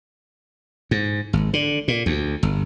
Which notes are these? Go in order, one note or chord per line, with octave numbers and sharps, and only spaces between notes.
G#2
G#1
D3
A#2
D2
G1